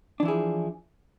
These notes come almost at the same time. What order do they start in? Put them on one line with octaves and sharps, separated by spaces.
D4 E3 E4 G#4 F3